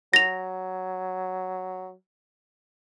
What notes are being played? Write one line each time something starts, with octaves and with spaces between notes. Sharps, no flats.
F#3 A#6 F7